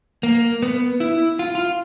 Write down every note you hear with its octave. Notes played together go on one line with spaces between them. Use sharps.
A#3
B3
E4
F4
F4